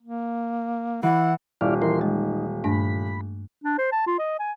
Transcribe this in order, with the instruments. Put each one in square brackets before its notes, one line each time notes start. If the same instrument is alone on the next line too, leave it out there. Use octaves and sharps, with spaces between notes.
[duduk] A#3
[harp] E3 [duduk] E4 [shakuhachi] F#5
[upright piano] D#1 [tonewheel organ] E4 D5 F5
[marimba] E3 [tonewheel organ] E4 A#4 C6
[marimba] G#3 [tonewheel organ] D#4
[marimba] G2 A3 D4 [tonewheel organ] B5
[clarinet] D4
C5
A5
F4
D#5
G#5